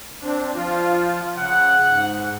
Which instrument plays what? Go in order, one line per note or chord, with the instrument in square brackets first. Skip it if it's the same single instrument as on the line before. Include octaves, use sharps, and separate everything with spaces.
[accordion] C4 D4
F3 F4
[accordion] C#3 [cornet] F#5
[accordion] G#2